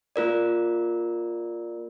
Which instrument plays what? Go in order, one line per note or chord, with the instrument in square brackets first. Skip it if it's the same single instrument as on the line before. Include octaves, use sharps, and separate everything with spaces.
[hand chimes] A#3 F4 A#4 D5